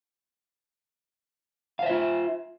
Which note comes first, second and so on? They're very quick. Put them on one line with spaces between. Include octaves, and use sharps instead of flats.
F5 C5 E5 F4